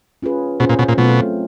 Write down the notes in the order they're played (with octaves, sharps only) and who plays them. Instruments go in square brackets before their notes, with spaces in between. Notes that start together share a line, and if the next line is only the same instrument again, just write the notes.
[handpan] C#4 F4 G#4 B4
[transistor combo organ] B2 [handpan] C#4 F4 G#4 C5
[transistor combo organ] A#2
B2
A#2
[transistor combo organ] B2 [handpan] F#3 A3 C4 F4